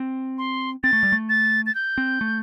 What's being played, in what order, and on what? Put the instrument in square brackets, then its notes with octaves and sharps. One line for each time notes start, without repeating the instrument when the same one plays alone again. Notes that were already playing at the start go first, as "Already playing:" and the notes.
Already playing: [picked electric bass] C4
[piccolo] C6
[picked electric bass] C4 [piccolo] A6
[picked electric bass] A3
G3
A3
[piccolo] A6
A6
G6
[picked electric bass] C4
A3